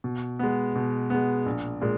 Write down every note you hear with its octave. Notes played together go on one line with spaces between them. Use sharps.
B2
G#3 B3
B2
G#3 B3
A#1
A#2 G#3